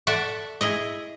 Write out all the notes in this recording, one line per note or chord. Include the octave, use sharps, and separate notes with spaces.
A4 D5 E5 F#5
E4 G#4 D#5